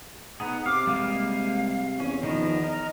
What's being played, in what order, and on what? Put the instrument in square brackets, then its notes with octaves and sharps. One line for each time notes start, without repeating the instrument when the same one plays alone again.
[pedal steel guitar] B3 D#4 G#4 [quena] F#5
[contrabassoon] C3 [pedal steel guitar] F5 [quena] D6
[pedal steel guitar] G3 G#3 A#3 [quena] F5
[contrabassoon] E2 [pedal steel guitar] C#4
[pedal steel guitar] D#3 F3 B3 [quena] D#5
[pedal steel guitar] A#4